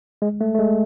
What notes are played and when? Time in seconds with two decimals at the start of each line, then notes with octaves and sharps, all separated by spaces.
0.22 G#3
0.41 A3
0.54 A3
0.59 G#3